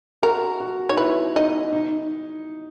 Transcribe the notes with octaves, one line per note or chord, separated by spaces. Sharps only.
F#4 A#4
F#4
D#4 C#5
E4 B4
D#4 D#5
D#4